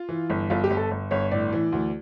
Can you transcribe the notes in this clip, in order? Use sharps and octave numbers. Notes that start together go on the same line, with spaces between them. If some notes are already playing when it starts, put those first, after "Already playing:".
Already playing: F4
E3
G1
G1 F4
G4
G1
A4
G1
G1 C#5
A2 D5
E3
D2